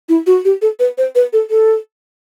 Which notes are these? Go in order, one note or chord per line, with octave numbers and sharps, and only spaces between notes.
E4
F#4
G4
A4
B4
C5
B4
A4
A4